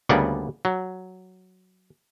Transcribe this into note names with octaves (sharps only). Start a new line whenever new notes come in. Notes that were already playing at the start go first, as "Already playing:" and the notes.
D2 C#3 G3 A#3 B3 D5
F#3